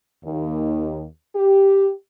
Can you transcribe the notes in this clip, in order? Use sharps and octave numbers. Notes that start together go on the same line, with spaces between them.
D#2
G4